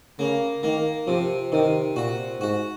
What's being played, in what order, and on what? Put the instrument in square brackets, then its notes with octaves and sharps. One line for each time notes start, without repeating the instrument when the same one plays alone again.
[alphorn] C#3 [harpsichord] A#3
[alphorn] D#3 [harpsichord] A#3
[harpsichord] C3 [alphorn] F3
[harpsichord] C3 [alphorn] D#3
[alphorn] A#2 [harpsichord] F#4
[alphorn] G#2 [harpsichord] F#4